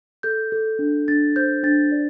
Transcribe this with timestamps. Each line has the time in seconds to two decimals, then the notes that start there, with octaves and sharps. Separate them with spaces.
0.23 A4 G6
0.52 A4
0.79 D4
1.08 D4 A6
1.36 C5 G6
1.63 D4 A6
1.92 D5